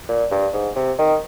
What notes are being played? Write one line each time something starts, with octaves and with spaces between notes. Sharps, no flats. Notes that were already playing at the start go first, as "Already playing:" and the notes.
A#2
G2
G#2
C3
D#3